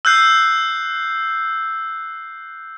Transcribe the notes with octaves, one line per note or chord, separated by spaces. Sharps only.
E6 F#6 G6 C7